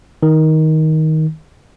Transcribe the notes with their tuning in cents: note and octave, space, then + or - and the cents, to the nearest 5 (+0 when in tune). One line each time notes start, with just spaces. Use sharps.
D#3 +15